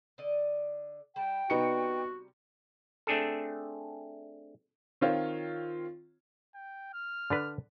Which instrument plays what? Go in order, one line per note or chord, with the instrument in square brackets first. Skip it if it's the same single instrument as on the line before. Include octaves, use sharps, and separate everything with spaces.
[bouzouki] D3 D5 D#5
[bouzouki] G3 A5 [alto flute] G5
[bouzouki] C3 G3 A#5 [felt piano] B3 D#4 C#7 [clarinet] F#4
[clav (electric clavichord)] A3 C4 D4 G#4 A4
[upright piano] D#3 C4 F4 C#5
[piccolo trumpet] G5
F6
[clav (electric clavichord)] D3 D4 B4